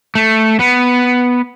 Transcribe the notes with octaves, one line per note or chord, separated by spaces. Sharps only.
A3
B3